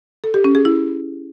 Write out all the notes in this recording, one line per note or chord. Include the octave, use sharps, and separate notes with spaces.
A4
G4
C#4
G#4
E4